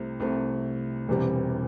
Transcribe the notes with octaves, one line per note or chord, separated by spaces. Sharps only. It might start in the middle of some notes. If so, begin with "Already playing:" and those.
Already playing: C2 C3 A3 C4
C2 C3 A3 C4
E1 E2 C3 G3 C4